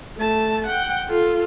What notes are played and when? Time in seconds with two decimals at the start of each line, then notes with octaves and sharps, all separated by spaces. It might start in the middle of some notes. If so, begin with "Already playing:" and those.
0.17 A3 A5
0.66 F#5 G5
1.09 F4 A4